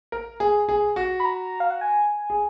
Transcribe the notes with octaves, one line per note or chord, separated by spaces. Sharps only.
A#4
G#4
G#4
F#4
B5
A#5
F5
F#5
G#5
G#4